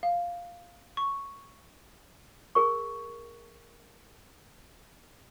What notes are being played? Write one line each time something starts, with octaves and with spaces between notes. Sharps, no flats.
F5
C#6
G#4 A#4 C#6